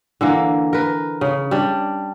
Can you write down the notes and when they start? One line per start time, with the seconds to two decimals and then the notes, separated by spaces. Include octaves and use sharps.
0.21 D3 E3 A#3
0.73 A#4 B4
1.21 C#3
1.51 G3 D4